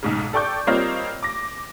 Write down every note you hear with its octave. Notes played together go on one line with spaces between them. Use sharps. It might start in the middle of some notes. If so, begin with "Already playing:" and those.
B1 G#2 C#3
A4 D5 G5 C#6 D6 G6
G3 A#3 C4 F4 C#5 D#5
D6 A#6